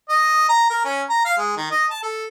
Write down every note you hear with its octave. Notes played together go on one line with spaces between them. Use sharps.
D#5
A#5
A#4
C#4
A#5
F5
G#3
D#3
D#5
A5
A4